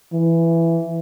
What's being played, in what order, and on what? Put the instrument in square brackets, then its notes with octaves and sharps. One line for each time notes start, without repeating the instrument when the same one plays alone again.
[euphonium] E3